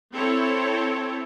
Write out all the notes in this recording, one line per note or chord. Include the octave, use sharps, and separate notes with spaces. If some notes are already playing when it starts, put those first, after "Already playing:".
C4 E4 A4 C#5